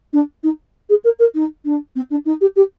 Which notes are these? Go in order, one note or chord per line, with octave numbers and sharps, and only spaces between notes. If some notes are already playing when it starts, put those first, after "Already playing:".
D4
D#4
G#4
A#4
A#4
D#4
D4
C4
D4
D#4
G4
G4